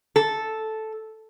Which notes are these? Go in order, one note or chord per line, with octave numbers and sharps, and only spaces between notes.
A4